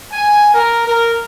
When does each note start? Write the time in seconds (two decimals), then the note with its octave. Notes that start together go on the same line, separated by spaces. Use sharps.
0.11 G#5
0.53 A#4
0.87 A#4